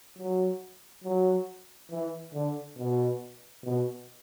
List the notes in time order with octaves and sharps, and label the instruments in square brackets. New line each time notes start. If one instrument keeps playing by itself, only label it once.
[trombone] F#3
F#3
E3
D3
B2
B2